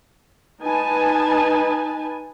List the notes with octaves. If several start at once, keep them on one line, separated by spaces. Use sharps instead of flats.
D#4 B4 G#5 A5